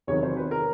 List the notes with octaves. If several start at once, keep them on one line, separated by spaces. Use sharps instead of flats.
E2 C3 D#3 F#3 B3 C#5
C5
B4
A#4